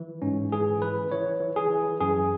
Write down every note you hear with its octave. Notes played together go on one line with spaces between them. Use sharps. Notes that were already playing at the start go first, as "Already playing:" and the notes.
Already playing: E3
G#2 C#4
E3 G#4
E3 B4
E3 C#5
E3
G#4
E3
F#2 G#4